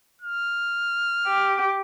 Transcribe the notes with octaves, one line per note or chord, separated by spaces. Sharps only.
F6
G4